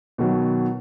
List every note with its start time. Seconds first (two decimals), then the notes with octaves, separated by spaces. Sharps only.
0.18 B2 D#3 F#3